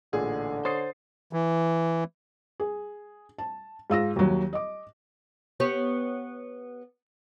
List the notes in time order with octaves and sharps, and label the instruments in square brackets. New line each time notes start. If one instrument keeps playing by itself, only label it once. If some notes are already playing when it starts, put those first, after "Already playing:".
[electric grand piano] A1 A#2 [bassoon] D3 [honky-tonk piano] G#4
[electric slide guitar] C5 [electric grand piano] C#5 D#6 [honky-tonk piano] A6 C7
[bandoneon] E3
[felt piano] G#4
A5
G#2 F4 E6 A#6
D#2 F#3
D#5 D6
[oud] B3 G4 C#5